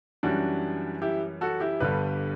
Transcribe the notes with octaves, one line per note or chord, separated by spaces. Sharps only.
F#2 E3 G3 D4 F#4
E4 G4
F#4 A4
E4 G4
G1 G2 D3 G3 G4 B4